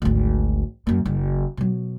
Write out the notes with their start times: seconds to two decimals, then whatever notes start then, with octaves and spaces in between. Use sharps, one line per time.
0.02 G#1 D2
0.87 F#2 A#3
1.06 F#1
1.57 B2 F#3